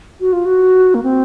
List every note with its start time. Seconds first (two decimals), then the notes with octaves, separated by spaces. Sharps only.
0.20 F#4
0.33 F4
0.45 F#4
0.95 A#3
1.03 C4